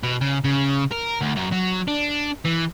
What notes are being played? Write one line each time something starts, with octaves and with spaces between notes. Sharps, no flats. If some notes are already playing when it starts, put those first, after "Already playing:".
B2
C#3
C#3
A#4
D2
F#2
F#3
D4
E3